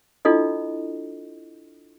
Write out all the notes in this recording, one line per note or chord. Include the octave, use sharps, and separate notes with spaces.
D4 E4 F4 A4 D#5